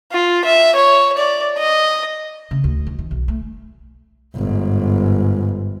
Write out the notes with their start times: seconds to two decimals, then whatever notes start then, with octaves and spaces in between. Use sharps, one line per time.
0.12 F4
0.45 E5
0.76 C#5
1.17 D5
1.58 D#5
2.51 C#3
2.64 D2
2.87 E3
2.99 D#3
3.11 B1
3.28 A3
4.35 G1 G#2